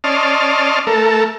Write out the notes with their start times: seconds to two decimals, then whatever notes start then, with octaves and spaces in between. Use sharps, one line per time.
0.04 C#4 D5 D#5 A5 C6 F6
0.87 A3 A4 A#4